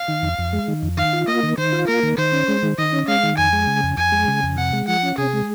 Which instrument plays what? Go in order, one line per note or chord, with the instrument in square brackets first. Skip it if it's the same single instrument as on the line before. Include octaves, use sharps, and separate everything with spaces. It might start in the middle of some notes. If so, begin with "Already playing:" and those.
Already playing: [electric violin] F5
[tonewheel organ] D#3
F2
F2
G#3
D#3
F2
[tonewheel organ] D#3 [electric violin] F5
[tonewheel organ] F4
[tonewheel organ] A#3 [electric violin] D#5
[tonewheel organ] D#3
[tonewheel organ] D#3 [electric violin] C5
[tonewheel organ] F4
[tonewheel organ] A#3 [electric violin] A#4
[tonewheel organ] D#3
[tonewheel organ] D#3 [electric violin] C5
[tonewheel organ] C#4
G#3
D#3
[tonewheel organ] D#3 [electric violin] D#5
[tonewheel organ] C#4
[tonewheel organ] G#3 [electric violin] F5
[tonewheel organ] D#3
[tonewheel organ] F2 [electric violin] G#5
[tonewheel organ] G#3
C#3
F2
[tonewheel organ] F2 [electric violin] G#5
[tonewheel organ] G#3
C#3
F2
[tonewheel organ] C3 [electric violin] F#5
[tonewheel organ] G#3
[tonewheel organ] F3 [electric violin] F#5
[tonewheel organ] C#4
[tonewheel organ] C3 [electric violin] G#4
[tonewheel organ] G#3